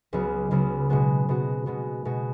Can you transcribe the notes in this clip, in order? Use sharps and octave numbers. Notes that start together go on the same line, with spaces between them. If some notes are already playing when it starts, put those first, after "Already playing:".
C#2 C#3 F#3 B3 F#4
C#2 C#3 F#3 B3 F#4
B2 G#3 B3 F#4
B2 G#3 B3 F#4
B2 G#3 B3 F#4
B2 G#3 B3 F#4